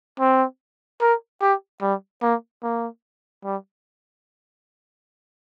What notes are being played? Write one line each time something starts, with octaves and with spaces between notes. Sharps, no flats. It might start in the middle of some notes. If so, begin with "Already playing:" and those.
C4
A#4
G4
G3
A#3
A#3
G3